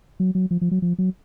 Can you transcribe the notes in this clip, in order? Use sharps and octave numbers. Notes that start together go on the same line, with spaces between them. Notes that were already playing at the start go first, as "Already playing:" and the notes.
F#3
F#3
F3
F3
F#3
F3
F#3